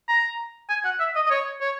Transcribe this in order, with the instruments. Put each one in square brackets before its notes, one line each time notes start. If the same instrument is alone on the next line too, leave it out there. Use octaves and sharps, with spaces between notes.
[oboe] A#5
G#5
F#5
E5
D#5
D#5
C#5
C#5